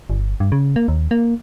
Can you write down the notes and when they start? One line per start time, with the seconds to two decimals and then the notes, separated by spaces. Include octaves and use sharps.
0.10 G1
0.40 G2
0.52 C#3
0.76 A#3
0.88 D#2
1.11 A#3